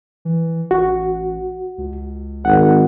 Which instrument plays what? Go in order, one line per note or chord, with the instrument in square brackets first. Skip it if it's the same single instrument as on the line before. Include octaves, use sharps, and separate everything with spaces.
[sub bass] E3
[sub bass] A1 [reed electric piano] F#4
[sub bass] C#2
[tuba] G#1 [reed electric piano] F#5